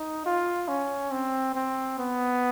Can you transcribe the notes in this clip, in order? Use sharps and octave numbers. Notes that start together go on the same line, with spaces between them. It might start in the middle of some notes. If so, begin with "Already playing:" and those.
Already playing: D#4
F4
C#4
C4
C4
B3